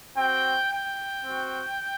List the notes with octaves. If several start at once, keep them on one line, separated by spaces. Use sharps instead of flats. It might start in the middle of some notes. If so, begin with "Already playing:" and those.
C4 F#4 G5
G5
C4 F#4